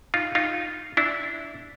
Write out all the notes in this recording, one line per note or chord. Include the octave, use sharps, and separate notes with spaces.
D#4 F4
D#4 F4
D4 E4